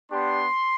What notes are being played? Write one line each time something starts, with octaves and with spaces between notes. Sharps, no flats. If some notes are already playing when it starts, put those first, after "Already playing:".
B3 D4 G4 C6